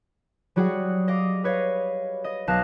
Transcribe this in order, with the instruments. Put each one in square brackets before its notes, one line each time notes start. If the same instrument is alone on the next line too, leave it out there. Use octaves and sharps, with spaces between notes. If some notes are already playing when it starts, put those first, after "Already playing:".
[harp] F#3 G3 F#4 G#4 F#5
D#5 F5 D6
B4 C#5 D#5 F5
D#5
B1 F5 A5 F#6 A#6